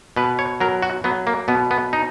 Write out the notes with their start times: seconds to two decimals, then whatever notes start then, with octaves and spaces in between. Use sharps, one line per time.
0.16 B2 B4
0.39 C#5
0.60 F#3 A#4
0.82 F#4
1.04 F#3 B3
1.27 A#3
1.48 B2 B3
1.71 B3
1.93 D#4